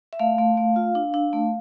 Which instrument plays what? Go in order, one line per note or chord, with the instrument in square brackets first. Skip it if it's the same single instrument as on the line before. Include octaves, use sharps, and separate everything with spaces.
[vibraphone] E5
A3 F5
A3
A3
F4
D4
D4
A3